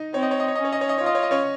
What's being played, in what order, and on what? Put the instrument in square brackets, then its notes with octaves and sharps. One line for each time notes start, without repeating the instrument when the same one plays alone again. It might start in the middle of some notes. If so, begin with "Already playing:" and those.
Already playing: [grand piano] D#4 D#5
[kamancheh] C4 [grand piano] C#5
[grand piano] D#5
C#5
D#5
C#5
[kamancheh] C#4 [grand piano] D#5
[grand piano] C#5
D#5
C#5
D#5
[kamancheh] F4 [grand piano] C#5
[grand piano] D#5
C#5
D#5
C#4 C#5